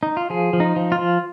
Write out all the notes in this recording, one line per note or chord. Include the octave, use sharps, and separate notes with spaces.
D#4
F4
F3 G#4
F3
D#4
F3
F4
F3